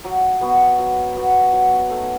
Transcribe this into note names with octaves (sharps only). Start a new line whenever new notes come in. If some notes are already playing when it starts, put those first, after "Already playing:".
F#3
B3 F#4 B4
F#3
B3 F#4 B4
F#3
A3 D#4